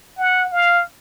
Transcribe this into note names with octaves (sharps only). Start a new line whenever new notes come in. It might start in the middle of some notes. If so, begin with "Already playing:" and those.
F#5
F5